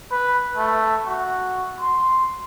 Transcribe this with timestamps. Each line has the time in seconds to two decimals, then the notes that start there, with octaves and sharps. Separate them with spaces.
0.11 B4
0.56 A3
1.07 F#4
1.80 C6